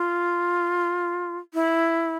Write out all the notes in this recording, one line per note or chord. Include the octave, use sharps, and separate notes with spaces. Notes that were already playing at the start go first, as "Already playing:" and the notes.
Already playing: F4
E4